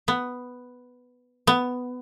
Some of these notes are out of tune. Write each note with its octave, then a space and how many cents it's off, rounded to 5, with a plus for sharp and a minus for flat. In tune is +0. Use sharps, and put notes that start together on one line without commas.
B3 +5
B3 +10